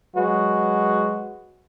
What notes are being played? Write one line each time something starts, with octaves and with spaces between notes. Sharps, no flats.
F#3 G#3 F#4 B4